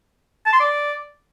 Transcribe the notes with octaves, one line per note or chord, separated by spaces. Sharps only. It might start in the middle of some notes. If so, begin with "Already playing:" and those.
A5
C6
D5